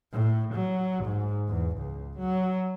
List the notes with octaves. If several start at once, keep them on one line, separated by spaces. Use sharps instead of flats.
A2
F#3
G#2
E2
C#2
F#3